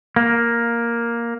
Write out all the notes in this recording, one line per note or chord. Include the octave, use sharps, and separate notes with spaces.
A#3